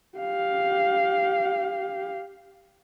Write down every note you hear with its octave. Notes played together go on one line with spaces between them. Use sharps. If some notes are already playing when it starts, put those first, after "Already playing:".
G4 F5